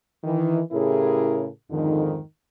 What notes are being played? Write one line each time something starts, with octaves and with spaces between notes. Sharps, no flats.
D#3 E3
A2 C#3 E4 G4 G#4 A#4
F2 G#2 D3 D#3